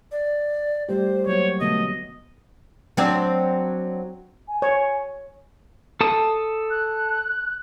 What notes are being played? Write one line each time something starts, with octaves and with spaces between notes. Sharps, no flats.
D5
G3 A3 G4 C5
F#3 A#3 F#4 C#5
B2 D3 A3 B3 D#5
F#3 C4 D4
G#5
C#5
A4 A5 D#6
F#6